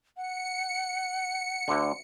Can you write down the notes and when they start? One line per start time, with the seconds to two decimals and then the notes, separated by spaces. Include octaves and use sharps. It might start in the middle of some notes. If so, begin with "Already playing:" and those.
0.17 F#5 C#7
1.68 D2 D3